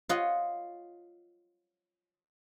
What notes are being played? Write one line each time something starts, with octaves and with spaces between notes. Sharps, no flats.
F4 C#5 D#5 F#5